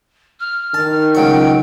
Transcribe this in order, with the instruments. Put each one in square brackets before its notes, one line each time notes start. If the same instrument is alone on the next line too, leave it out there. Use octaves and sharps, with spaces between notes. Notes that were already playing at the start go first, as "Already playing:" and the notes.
[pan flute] F6
[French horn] D#3 [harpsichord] A5
[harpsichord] C#2 F#3 C#6 [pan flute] G5